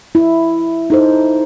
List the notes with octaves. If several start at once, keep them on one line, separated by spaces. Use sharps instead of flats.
E4
D#4 A4 C5